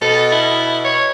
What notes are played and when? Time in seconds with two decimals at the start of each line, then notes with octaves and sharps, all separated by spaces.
0.01 B2 A4
0.32 E4
0.84 C#5